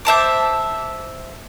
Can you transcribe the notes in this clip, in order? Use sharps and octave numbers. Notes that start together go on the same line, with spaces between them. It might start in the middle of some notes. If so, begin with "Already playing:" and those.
C5 E5 A5 D6